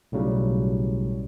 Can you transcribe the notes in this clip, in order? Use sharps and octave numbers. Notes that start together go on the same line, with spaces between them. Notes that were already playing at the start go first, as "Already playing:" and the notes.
B1 A2 C#3 F#3 G3